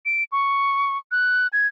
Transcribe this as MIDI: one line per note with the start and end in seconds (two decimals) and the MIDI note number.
0.06 0.24 98
0.32 0.98 85
1.12 1.47 90
1.53 1.67 92